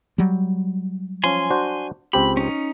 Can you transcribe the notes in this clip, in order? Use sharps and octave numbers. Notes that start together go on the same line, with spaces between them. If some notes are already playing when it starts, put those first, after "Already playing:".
F#3 G3
F3 C#4 G#5 C6
D4 F#4 C5
C#2 C4 G4 B5
C#4 D#4